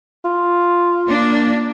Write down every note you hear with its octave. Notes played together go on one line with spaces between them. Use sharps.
F4
A#3 D4